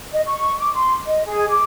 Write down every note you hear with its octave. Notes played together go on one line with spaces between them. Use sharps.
D#5
C#6
D6
C6
D#5
G#4
D6